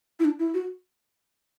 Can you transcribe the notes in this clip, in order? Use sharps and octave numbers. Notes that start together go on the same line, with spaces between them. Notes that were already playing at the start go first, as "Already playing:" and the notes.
E4
D4
E4
F#4